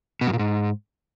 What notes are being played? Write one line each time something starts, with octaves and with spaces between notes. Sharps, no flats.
B2
F#2
A#2
G#2